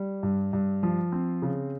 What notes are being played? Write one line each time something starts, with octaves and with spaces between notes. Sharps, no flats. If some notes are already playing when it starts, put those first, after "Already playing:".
Already playing: G3
G2
G2
F3
C4
C#3